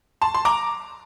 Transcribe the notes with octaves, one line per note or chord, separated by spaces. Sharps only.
A5 C6
C6
A#5 D6